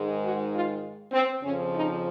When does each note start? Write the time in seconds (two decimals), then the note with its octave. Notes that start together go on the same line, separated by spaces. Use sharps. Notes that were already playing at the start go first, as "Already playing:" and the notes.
Already playing: G#2 D#3 G#3
0.22 F#4
0.52 F4
1.12 C4
1.43 F2 C#3 F3 C#4
1.73 D#4